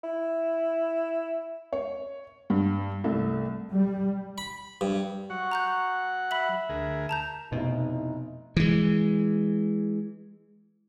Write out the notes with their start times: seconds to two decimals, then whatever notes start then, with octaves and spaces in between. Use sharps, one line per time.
0.03 E4
1.73 C#5
2.50 G2
3.04 C2 A3
3.71 G3
4.38 B5
4.81 G2
5.30 F#3 F#5 C#6
5.51 A#5 F#6 G6
6.31 E5 B5 B6 F#7
6.69 D2 G#4 A#4
7.09 A5 A#5 G6
7.52 F1 B2 D#4 E4
8.57 E3 G#3